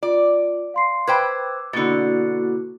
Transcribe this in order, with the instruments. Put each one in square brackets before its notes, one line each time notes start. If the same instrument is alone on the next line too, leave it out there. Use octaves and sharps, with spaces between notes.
[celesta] F4 [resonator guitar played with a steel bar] D5
[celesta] F5 C6 C7
[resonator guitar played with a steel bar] B4 C5 G5 [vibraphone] D6 E6 [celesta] G#6
[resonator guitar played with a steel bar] B2 D3 [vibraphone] A#3 E4 F#4 [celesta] A6 C#7